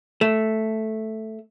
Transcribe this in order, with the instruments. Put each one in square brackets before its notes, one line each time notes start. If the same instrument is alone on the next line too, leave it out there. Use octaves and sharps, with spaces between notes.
[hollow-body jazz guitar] A3